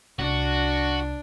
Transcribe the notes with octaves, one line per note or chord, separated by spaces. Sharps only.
C2 D4 F#4